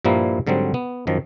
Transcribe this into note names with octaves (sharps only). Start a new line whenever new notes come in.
G2 A#2 F3 G3 A#3 E4
G#2 D3 F#3 G3 C4
B3
F#2 D#3 F3